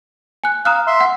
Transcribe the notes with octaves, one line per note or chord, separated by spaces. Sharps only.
G#5 F#6
F5 A#5 D#6 F#6
E5 C6
F#5